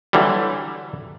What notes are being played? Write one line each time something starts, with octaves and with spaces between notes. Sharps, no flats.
D3 E3 F#3 G3